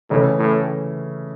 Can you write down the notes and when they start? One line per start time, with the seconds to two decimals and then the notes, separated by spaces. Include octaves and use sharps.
0.10 A2 C#3 E3 A3 C#4
0.39 A2